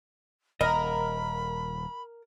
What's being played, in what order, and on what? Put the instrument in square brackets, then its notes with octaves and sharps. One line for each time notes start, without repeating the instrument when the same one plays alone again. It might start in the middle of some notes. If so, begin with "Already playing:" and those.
[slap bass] D#1 [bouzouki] A#4 [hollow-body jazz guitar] D#5 [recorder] B5